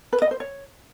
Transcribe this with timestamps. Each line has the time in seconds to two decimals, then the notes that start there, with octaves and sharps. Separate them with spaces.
0.13 B4
0.22 D#5
0.31 C5
0.40 C#5